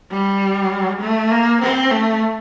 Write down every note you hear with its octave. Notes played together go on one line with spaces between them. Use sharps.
G3
A3
A#3
C4
A3